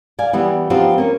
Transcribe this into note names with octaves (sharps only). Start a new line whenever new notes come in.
D5 F5 G#5
E3 G3 B3
F3 B3 C4 D#4 F4 G4
A#3 C#4